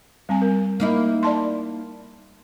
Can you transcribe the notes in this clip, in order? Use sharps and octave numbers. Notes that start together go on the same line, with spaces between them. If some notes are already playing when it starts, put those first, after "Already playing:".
G3 C4 G#5
A#4
A#3 D#4 E4
D5 A5 C6